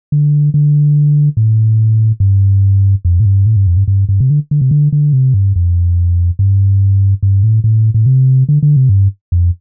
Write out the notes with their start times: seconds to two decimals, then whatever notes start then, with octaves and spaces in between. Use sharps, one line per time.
0.12 D3
0.54 D3
1.37 A2
2.20 G2
3.05 F2
3.20 A2
3.26 G2
3.46 A2
3.56 G2
3.67 F2
3.77 G2
3.88 G2
4.09 G2
4.20 C3
4.30 D3
4.51 D3
4.61 C3
4.71 D3
4.92 D3
5.13 C3
5.34 G2
5.56 F2
6.39 G2
7.23 G2
7.43 A2
7.64 A2
7.94 A2
8.06 C3
8.49 D3
8.63 D3
8.77 C3
8.89 G2
9.32 F2